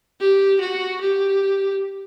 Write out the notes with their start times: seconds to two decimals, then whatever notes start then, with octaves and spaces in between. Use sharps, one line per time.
0.20 G4
0.60 F#4
1.00 G4